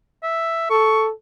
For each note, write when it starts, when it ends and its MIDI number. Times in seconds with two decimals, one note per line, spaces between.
0.23 0.69 76
0.70 1.12 69
0.70 1.04 85